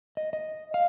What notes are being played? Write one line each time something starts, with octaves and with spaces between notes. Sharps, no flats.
D#5
D#5
F5